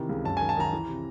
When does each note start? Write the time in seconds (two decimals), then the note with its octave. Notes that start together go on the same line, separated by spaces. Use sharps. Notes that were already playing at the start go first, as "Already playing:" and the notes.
Already playing: C3 D#3 E3
0.09 C#2
0.25 F#2 A5
0.37 D#3 G#5
0.49 A5
0.57 D#3 A#5
0.72 E3
0.88 C3